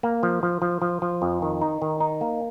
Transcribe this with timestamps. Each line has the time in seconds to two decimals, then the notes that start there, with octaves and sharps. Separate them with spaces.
0.03 A#3
0.23 F3
0.43 F3
0.62 F3
0.82 F3
1.02 F3
1.22 F2
1.42 D#3
1.61 D#4
1.82 D#3
2.00 D#4
2.21 A#3